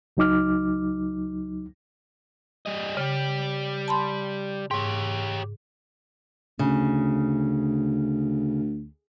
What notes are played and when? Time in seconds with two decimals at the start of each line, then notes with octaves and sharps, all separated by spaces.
0.17 C#2 F#3 D#4 D6 F6
2.66 G3 D#5
2.97 C#3 G3 G4
3.88 A5 B5 C6
4.71 G#2 G4 C#5
6.59 D2 C#3